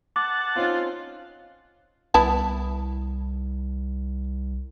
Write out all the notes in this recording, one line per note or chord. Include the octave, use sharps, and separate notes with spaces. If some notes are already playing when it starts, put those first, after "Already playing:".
F#5 A5 D6
C4 C#4 D#4 F4
C2 B3 E4 A5